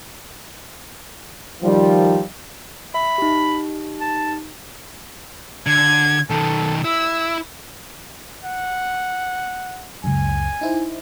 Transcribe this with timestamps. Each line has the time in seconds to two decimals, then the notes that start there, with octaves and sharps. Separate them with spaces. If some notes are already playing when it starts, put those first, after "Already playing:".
1.63 D#3 F3 G3
2.94 E5 B5
3.18 D#4 G4
4.01 A5
5.66 D3 G#6
6.30 B1 D#3 A4
6.85 E4 E6
8.44 F#5
10.04 C#2 F#2 G#5
10.61 D#4 E4 C5